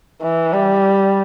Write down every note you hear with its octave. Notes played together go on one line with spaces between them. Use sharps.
E3
G3